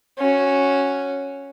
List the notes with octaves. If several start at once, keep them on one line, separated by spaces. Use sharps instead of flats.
C#4 F#4